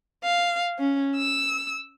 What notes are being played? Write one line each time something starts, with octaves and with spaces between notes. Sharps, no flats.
F5
C#4
E6